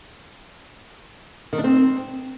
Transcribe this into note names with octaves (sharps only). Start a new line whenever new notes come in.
D#3
D4
C4